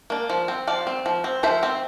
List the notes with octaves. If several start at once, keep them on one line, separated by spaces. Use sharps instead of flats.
A#3 D4
F3
C4
F3 D5 F5
C4
F3
C4
F3 C5 E5
C4